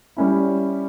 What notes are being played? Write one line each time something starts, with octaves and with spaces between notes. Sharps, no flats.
G3 C#4 E4